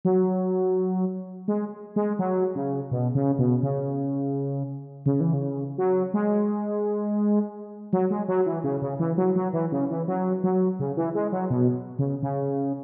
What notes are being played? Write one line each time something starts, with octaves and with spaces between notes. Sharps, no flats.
F#3
G#3
G#3
F#3
C#3
B2
C#3
B2
C#3
C#3
E3
C#3
F#3
G#3
F#3
G#3
F#3
E3
C#3
C#3
E3
F#3
F#3
E3
C#3
E3
F#3
F#3
C#3
E3
G#3
F#3
B2
C#3
C#3